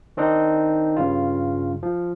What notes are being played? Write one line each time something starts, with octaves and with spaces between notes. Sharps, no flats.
D#3 C4 D4 D#4
G2 C#3 F4
F3